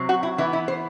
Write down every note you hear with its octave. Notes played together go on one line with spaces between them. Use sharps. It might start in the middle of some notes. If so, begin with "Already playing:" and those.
Already playing: C3 F#3 C4
F#4
E4
E3 B3 E4
E4
C5